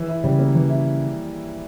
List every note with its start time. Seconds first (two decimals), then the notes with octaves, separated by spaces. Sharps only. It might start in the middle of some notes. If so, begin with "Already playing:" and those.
Already playing: E3
0.09 E4
0.24 C#3 G3
0.39 A#3
0.55 E3
0.69 E4